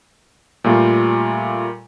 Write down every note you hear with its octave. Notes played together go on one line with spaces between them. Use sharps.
A#2 G3 A3 F4